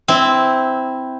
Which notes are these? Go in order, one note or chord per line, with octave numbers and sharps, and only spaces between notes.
C4 E4